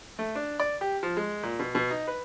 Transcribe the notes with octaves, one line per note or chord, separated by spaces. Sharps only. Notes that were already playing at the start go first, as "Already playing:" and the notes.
A3
D4
D5
G4
F3
G#3
A#2
B2
B2
D#4
B4